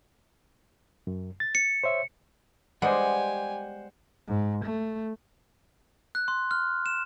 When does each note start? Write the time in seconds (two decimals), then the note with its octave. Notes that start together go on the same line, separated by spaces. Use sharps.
1.07 F#2
1.40 A6
1.55 C#7
1.84 C5 C#5 E5
2.82 G3 G#3 B3 G4 C5 F#5 G#5
4.28 G#2
4.65 A3
6.15 F#6
6.28 C6
6.51 F6
6.86 E7